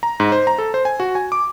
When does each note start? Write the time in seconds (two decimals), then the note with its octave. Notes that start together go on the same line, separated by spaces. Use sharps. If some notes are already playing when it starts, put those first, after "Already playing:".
0.03 A#5
0.20 G#2
0.32 C5
0.47 A#5
0.58 A4
0.74 C5
0.85 G#5
1.00 F#4
1.15 G#5
1.32 D6